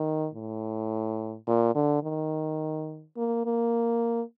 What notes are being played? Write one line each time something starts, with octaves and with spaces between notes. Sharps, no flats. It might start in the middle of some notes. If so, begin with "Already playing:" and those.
Already playing: D#3
A2
A#2
D3
D#3
A#3
A#3